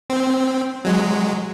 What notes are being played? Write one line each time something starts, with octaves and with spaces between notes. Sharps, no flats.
C4
F#3 G#3